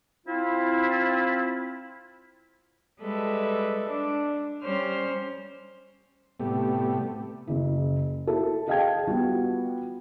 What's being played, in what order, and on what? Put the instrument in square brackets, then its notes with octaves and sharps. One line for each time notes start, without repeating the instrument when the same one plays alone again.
[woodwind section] C4 E4 F4
[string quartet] G3 G#3 A4 B4 E5
D4
G3 C#4 C5 C#5 F6
[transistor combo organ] A2 C3 G3 A3 B3 G4
[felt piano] F#1 E4
E4 A4
G#4 D#5 F5 G5 A5 G#6
G3 B3 F4 F#4